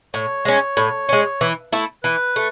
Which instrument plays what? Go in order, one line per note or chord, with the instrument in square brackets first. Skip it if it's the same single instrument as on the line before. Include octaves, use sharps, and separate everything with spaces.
[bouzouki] A2 [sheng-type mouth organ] C#5
[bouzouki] G#3 C#4
A2
G#3 C#4
E3
A3 E4
[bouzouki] E3 [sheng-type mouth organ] B4
[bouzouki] A3